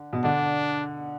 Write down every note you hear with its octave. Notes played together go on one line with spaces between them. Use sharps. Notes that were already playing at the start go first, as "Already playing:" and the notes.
Already playing: D3
B2
D3 D4